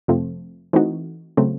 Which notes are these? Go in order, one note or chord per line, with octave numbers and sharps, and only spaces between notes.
F2 C3 F3 A3 C4
E3 A3 C4 D#4 F#4
C#3 F#3 A3 C4